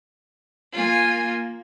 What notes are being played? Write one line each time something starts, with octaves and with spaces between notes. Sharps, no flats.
A#3 F4 G#5